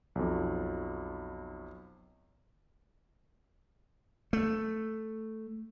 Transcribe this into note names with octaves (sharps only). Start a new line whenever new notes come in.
B1 F2
A3